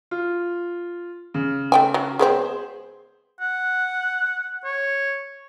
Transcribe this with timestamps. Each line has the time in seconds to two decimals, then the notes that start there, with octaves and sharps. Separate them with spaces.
0.11 F4
1.34 C#3
1.72 A3 G5 G#5
1.94 F#3
2.19 G#3 B3 C4 G#4 C5
3.41 F#5
4.65 C#5